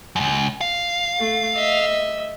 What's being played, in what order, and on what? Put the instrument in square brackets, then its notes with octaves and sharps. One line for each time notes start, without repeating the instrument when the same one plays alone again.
[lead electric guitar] C#2 F#2
F5
[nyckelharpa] A3
D#5 E5